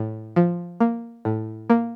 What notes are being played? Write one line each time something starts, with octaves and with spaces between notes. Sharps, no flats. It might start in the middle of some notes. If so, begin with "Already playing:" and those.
Already playing: A2
F3
A#3
A2
A#3